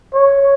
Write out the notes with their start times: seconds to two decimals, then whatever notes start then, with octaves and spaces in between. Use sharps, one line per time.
0.14 C#5